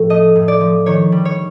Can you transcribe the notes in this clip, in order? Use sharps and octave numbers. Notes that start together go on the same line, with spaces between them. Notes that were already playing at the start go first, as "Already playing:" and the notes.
Already playing: A2 F3
A3 D#5
A2
D5
F3
D#3 C#5
G3
C#5